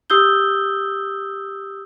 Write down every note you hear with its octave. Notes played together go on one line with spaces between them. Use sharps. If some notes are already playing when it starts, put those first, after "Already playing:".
G4 D#6 E6 G6 G7